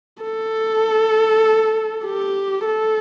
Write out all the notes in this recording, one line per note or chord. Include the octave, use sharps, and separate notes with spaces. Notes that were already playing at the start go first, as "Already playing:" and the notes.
A4
G4
A4